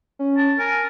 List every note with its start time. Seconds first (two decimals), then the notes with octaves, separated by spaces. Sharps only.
0.19 C#4
0.37 A5
0.59 A#4 G#5
0.71 G#5